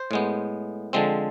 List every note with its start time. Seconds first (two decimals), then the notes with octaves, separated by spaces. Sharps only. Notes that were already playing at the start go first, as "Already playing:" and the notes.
Already playing: C5
0.11 A2 G#3 B3
0.93 D3 F3 G#3 C4